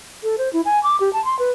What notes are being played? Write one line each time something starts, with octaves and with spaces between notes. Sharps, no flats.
A4
C5
E4
G#5
D6
G4
A5
C6
B4